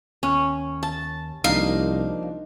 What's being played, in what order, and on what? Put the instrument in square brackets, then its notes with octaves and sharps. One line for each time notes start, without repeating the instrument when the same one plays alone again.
[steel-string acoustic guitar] D#2 [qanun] C#4
[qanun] A5
[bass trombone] C2 [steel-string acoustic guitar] F3 A#3 D4 [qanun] D#4 [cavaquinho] F5